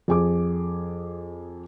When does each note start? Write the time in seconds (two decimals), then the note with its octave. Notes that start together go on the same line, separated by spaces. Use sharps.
0.08 F2 G#4 D6